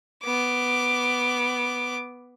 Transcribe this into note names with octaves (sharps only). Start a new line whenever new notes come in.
B3 D6